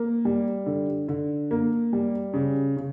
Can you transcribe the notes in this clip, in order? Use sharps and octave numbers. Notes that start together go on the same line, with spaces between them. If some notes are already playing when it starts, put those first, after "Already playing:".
Already playing: A#3
G3
D3
D3
A#3
G3
C#3
C#3